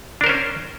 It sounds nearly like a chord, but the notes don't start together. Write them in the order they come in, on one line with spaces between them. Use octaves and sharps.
D4 A#4 C5 C#4